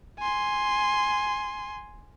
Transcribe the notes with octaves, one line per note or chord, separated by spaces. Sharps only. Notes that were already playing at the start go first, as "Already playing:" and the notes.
G#5 C6